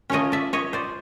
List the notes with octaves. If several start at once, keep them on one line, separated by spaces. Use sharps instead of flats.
F3 A3 C#4 C#5 D#5
D5 E5
C#5 D#5
C5 D5